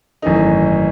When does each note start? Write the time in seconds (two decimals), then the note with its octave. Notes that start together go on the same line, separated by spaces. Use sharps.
0.22 G#1 F#2 E3 A3 D#4